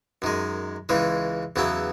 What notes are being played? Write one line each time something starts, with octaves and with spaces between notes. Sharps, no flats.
F#2 D#3 G#3
C#2 C#3 E3 G#3
E2 C#3 F#3 B3 E4